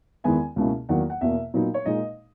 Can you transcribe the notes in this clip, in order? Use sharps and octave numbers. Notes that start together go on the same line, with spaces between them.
E2 D#3 G#3 B3 E4 G#5
C#2 B2 A#3 C#4 E4
E2 D#3 F#3 A#3 F#5
F#5
E2 B2 A#3 E5
A#2 F#3 B3 D#4
C#5
A#2 G#3 D#4 D#5